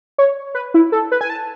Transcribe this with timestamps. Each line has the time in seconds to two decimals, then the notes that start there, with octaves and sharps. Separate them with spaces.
0.18 C#5
0.55 B4
0.74 E4
0.92 A4
1.12 B4
1.21 G#5
1.30 A5